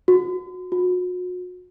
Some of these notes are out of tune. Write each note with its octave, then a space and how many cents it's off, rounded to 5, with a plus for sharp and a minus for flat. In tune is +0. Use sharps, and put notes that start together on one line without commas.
F#4 -25
F#4 -40